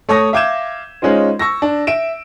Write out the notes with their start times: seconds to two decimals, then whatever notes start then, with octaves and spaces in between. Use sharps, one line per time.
0.09 A3 C#5 C#6 D#6 A#6
0.33 E5 F5 D6 G6 G#6 E7
1.02 G#3 C#4 D#4 F4 C5
1.39 C#6 E6 A#6
1.62 D4
1.87 E5 D7 E7